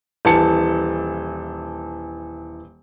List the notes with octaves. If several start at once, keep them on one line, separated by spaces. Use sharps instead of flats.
D#1 E3 A5 C#7